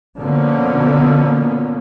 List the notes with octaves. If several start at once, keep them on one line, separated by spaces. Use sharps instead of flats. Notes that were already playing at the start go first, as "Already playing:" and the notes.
B2 D3 F3 A#3 B3 C#4